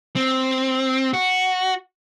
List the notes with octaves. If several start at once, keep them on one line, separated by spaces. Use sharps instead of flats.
C4
F#4